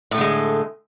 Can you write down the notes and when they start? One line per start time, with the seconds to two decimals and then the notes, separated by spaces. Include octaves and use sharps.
0.11 A2
0.15 A3
0.18 D3
0.21 G#3